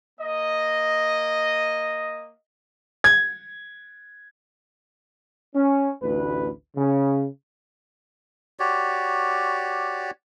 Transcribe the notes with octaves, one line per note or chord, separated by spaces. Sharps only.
A#3 D#5
G#6
C#4
A1 D2 B4
C#3
F#4 G4 C#5 D5